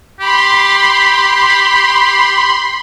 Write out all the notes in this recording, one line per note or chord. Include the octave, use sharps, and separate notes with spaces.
G4 B5 C6